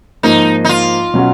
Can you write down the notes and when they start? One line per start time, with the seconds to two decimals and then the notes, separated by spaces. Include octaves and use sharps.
0.23 G#2 F3 A#3 D#4
0.65 D#4
0.69 F4
1.14 B2 F#3 C#4 F#4